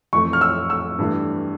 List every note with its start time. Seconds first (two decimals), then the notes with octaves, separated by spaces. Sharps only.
0.13 F2 E3 A3 C#6
0.33 F6
0.41 E6
0.70 E6
0.99 G2 E3 A3